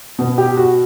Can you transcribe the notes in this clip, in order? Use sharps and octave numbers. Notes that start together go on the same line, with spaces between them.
B2
G4
F#4